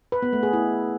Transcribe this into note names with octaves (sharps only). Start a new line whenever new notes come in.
B4
B3
A3
G#4
E4